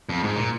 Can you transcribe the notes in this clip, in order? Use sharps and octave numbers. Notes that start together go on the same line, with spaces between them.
F2
G#2
A#2